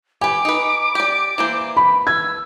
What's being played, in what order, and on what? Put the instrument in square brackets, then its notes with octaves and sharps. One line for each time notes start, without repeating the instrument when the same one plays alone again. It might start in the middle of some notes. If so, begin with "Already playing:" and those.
[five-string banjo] G4 B4 [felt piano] G#5 [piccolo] D6
[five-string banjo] D#4 B4
G4 D5
E3 A#3 C5
[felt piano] B5
[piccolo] E6 [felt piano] G#6